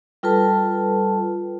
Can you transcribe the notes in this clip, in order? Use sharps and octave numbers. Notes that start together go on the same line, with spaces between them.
G3 F4 A4 B4 A5